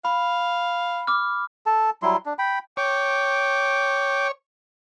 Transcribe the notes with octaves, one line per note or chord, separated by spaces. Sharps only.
F5 B5
D6 F6
A4 A5
F#3 G3 E4 C6
D4
G5 B5
C#5 G5 D6